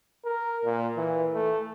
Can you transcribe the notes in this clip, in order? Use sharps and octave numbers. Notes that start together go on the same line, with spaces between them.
A#4
A#2
E3
A3